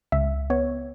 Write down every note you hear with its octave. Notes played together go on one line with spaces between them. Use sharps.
C#2 E5
B3 C#5